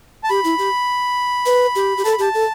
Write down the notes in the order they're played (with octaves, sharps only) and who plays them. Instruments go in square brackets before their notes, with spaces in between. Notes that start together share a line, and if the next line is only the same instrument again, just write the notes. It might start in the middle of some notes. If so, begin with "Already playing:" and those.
[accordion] A5
[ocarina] G4 [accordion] B5
[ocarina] E4
G4
B4
G4
G4
[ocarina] A4 [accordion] A5
[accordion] B5
[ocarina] G4 [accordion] A5
[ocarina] A4